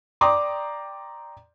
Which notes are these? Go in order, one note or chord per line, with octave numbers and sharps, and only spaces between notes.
D5 G5 A#5 C6 D6 D#6